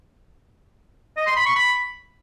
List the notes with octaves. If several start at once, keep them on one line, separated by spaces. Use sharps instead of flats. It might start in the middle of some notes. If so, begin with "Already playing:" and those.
D#5
C6
B5
C#6
B5